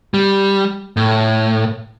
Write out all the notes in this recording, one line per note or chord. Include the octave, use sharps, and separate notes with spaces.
G3
A2